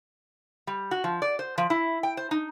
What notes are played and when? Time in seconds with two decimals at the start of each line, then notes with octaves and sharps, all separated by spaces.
0.67 G3
0.91 F#4
1.04 F3
1.22 D5
1.39 C5
1.58 F3
1.70 E4
2.03 G5
2.17 C5
2.31 D#4